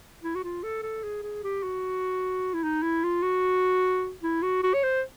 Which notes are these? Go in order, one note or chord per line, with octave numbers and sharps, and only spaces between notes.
E4
F#4
F4
A4
A4
G#4
G#4
G4
F#4
E4
D#4
E4
F4
F#4
E4
F#4
F#4
C#5
C5